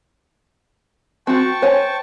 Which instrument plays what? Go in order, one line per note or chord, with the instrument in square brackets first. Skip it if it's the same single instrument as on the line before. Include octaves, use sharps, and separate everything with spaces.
[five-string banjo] C4 F#4 [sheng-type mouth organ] G5 A5 C#6
[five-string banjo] C5 C#5 G#5